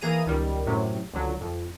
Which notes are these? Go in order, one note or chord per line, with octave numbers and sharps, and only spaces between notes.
E3 A#3 G#4 A#5 D#7
C#2 D#3 G3
F#2 A2 C3 F#3
C#2 D3 F#3
F2